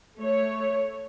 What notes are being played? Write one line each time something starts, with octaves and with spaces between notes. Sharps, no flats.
A3 C#5